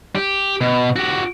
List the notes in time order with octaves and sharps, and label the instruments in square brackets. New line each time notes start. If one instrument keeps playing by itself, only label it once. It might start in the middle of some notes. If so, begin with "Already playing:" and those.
[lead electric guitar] G4
B2
F#4 G4